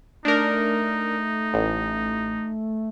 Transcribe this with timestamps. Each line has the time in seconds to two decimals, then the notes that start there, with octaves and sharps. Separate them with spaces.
0.25 A3 D4 D#4 A#4
1.54 A1